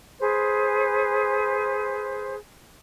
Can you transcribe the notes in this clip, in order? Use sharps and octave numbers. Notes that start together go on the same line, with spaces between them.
G#4 B4 C5